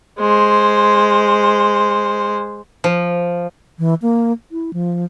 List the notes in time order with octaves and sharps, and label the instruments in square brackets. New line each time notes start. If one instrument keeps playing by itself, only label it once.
[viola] G#3 C5
[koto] F3
[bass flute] E3
A#3
E4
F3